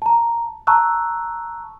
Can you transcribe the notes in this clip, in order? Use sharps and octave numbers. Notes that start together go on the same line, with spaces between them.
A5 A#5
A5 A#5 C#6 E6 F#6